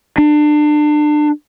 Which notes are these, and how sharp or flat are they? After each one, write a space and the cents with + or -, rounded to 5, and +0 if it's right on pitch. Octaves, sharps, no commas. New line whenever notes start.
D4 +30